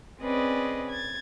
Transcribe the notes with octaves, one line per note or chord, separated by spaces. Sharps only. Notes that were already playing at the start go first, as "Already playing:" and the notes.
C4 C#4 G#4 B4 D5 D#5
G#6 A6